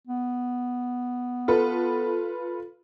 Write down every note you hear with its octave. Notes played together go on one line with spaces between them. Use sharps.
B3
F4 A4 B4